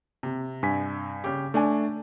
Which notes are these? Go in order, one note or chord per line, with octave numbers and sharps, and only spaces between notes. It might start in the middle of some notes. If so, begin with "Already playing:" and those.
C3
G2 G#5 B6
C#3 G4
A3 D4 G#5 D6